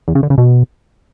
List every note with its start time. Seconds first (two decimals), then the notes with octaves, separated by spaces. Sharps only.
0.08 E2
0.15 C#3
0.23 D3
0.30 C#3
0.38 B2